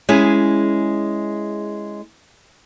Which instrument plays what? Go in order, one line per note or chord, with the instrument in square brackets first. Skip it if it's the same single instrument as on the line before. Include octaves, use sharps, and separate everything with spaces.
[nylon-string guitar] G#3 C#4 E4 G#4